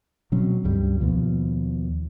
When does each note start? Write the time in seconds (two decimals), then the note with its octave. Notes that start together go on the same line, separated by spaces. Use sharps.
0.32 B2 F#3 C4 C#4
0.64 C#2 G2 G3
1.00 D#2 B2 F3